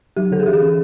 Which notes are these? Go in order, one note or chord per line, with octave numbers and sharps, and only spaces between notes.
F#3 G4
D3 A4
G#4
E3 G4
G#4
C#4